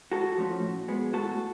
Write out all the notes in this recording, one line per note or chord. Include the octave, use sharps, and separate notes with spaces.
G#2 F#4 A4
F3 A3 C#4
A2
G#3 B3
A2 F#4 A4